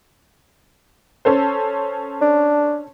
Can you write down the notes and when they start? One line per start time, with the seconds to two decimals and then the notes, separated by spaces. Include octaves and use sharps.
1.25 C#4 A4 C5
2.22 D4